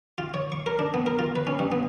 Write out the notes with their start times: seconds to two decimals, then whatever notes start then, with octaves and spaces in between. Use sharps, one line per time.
0.18 F4
0.34 C#5
0.52 C#6
0.66 A#4
0.79 D4
0.94 B3
1.06 A#4
1.19 F4
1.36 B4
1.47 C#4
1.59 G2
1.72 B3